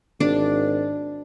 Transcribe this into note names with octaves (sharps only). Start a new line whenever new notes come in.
G#1 D4